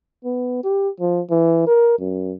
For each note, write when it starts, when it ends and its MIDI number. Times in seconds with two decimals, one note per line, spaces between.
0.25 0.61 59
0.64 0.89 67
1.00 1.21 53
1.31 1.66 52
1.67 1.99 70
1.99 2.34 42